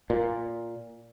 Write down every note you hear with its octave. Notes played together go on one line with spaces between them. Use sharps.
A#2